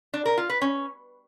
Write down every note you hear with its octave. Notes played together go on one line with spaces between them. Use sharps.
D4
A#4
F4
B4
C#4